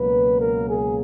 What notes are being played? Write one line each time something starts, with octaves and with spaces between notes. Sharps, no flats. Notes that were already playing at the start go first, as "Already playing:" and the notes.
Already playing: C#2 B2 F#3 A#3 B4
A#4
G#4